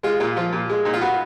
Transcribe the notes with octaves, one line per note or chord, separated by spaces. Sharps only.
G#3 F4
A#2 F4
F3 F4
A#2
G#3
A#2 D#4
F4
B3 F#4